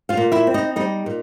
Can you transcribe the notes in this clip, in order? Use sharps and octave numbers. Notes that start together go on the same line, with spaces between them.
F4 F5
A#2
E4 E5
C4
D#4 D#5
G3 D#4 D#5
A#2